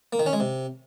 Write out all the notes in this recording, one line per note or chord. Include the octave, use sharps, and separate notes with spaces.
A#3
D#3
C#4
G#3
C3